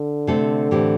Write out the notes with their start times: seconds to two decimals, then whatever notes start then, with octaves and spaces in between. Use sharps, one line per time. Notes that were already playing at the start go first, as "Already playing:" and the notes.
Already playing: D3
0.27 C3 A3 C4 A4
0.71 A2 E3 C4 G4